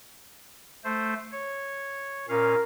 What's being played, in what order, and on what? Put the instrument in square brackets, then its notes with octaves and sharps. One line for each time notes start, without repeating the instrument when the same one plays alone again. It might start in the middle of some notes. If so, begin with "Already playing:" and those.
[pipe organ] A3 C5
C#5
[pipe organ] A#2 C#4 F5 [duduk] A#4